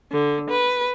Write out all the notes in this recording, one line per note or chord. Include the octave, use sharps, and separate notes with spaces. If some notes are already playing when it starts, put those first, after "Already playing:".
D3
B4